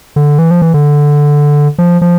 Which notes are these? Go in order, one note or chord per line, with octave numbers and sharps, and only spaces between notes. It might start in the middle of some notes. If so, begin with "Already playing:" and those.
D3
E3
F3
E3
D3
F3
F3